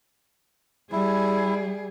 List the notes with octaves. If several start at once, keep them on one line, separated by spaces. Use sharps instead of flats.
G3 E4 G#4